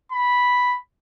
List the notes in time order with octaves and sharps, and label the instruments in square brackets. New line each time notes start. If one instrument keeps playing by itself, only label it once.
[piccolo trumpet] B5